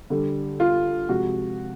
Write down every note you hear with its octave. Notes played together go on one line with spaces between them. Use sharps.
D3 G3
F4
C3 F3 G#3 F#4